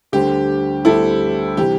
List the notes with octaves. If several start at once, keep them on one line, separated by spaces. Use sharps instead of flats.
D2 D3 G3 D4 G4 C5
D2 D3 G3 D4 E4 A4 C5
C3 E3 G3 C4 G4